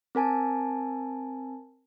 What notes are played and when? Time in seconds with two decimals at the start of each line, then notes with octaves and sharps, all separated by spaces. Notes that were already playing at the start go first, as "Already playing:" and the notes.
0.15 C4 A#4 G#5 A5